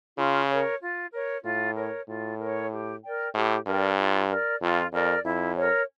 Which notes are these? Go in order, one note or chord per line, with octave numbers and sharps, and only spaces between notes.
C#3 F4
A#4 C#5
F4
A#4 C#5
A2 F4
A#4 C#5
A2 F4
A#4 C#5
G4
A#4 D5 G5
A2 G4
G2 A#4 D5 G5
F4
A#4 D5
F2 F4
F2 A#4 D5
F2 E4
A#4 C#5